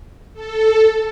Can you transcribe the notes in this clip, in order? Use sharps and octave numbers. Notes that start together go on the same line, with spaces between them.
A4